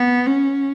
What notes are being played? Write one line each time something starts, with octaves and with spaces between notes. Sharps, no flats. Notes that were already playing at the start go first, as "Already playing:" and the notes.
Already playing: B3
C#4